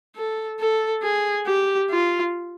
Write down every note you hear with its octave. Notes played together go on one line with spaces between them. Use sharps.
A4
A4
G#4
G4
F4